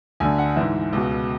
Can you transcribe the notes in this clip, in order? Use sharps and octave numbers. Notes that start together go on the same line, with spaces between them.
D2 D3 G#5
F#5
G#2 E3 E5
C#2 B2